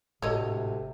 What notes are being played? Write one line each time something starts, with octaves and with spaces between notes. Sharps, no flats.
G#1 D2 A2 C3 G#3 A4 C#5 D#5